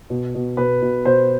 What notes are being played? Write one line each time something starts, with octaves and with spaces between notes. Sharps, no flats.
B2
B2
B2 B4
B2
B2 C5